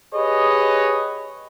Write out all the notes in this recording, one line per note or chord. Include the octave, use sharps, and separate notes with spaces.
G4 G#4 B4 C#5 D#5